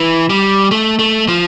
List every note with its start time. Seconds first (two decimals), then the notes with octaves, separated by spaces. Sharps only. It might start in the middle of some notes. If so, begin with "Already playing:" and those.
Already playing: E3
0.30 G3
0.71 A3
0.99 A3
1.28 F3